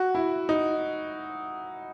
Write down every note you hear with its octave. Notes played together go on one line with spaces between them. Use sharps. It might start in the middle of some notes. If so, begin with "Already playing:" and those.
Already playing: F#4
E4
D#4